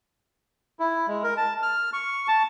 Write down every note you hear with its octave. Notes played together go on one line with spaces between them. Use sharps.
E4
G#3
A#4
A5
F6
C#6
A5